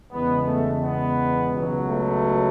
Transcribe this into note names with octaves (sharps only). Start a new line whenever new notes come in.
E2 C#3 G#3 B3
A3
B3
C#2 B2 F#3
A3